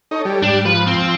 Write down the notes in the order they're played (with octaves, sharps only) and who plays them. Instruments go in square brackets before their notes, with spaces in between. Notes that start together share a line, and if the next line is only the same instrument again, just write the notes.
[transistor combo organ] D#4 [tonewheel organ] A4 C#5
[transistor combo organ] G3
[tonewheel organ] G#2 [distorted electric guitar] D4
[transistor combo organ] F3 [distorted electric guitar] B4
[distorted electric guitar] C4